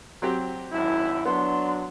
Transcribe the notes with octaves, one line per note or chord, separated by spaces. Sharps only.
F#3 C4 G4
G#1 F#2 E4
F#3 B3 D4 C6